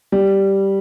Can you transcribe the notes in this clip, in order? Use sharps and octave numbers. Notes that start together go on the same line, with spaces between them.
G3